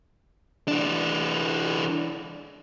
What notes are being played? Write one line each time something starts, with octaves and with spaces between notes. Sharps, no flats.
E3 D4